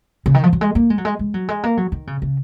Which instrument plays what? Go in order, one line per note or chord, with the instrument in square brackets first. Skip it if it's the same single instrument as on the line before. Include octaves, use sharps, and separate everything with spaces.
[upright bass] C#3
D#3
F3
F#3
G#3
A#3
G#3
F#3
G#3
G#3
F#3
G#3
A#3
F#3
D#3
C#3
C#3